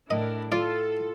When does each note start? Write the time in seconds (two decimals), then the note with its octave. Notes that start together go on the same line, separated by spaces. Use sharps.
0.11 A2 D4 E4 A#4 D#5
0.52 F4 A4 D5